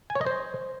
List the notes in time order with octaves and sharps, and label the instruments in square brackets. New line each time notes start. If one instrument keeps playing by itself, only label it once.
[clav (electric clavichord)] G#5
C#5
D#5
C5